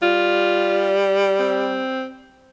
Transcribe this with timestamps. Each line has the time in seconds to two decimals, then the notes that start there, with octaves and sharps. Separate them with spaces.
0.02 G3 F4
1.39 C4